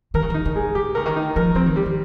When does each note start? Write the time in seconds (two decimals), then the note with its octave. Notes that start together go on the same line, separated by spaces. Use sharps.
0.14 D#3 A#4
0.22 C#3
0.30 D#3 D#4
0.45 C#3
0.56 G#3
0.75 D#3 G4
0.95 C#3 A#4
1.06 D#3
1.16 D#4
1.36 F3 A#4
1.55 F3 C4
1.66 D#3
1.76 G3
1.86 D#3